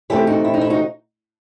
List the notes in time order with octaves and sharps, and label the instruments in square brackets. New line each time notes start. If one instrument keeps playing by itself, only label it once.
[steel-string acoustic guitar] C3 E3 A3 C4 E4 G4
D#4 F#4
E4
D#4
E4
D#4 F#4